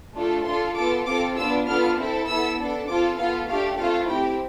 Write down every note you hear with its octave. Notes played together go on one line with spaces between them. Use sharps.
A3 D4 F4 A4
D4 F4 A4 C6
B3 F4 A4 D6
C4 F4 A4 D6
B3 D4 F4 E6
B3 D4 F4 A4 F6
C4 E4 A4
B3 E4 A4 E6
B3 D4 A4
C4 F4 A4 D6
B3 F4 A4 F5
A3 D4 G4 F5
A3 C4 F4 A4 F5
C4 E4 G4 G5